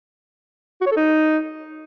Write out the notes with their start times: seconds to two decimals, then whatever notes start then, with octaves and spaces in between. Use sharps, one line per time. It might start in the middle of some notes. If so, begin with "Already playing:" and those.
0.81 F#4
0.86 C#5
0.92 A4
0.97 D#4